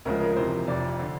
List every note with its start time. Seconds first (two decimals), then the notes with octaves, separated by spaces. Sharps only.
0.05 D2 C#3 F3 G#3 A#4
0.21 A#4
0.36 F2 C3 E3 C5
0.67 F1 F2 C3 D5
1.00 D3